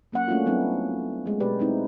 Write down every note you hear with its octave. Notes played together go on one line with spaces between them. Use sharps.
F#3 A#3 C#4 F#5
A3 A#3 C#4 D4 F4 F#4
F#3 G3 B3 C4 D4 E4
G#3 A3
B2 G#3 G4 B4 D5
G#3 C4 D#4 E4